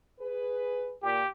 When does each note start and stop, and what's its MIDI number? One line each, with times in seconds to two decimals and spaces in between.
0.19 0.93 68
0.19 0.93 71
1.02 1.22 46
1.02 1.28 67